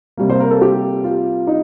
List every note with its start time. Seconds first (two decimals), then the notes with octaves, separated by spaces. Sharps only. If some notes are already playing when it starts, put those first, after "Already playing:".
0.17 C3 G3 A#3
0.30 C5
0.40 A#4
0.50 A4
0.61 G4
1.04 F4
1.47 D#4